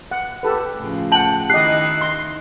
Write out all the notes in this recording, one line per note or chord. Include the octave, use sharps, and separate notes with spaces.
F#5
G4 A4 B4
A2 C#3 F3
F#5 G5 A5 F#7
D#3 D#4 E4 G4 D#5 F#6 C7
C6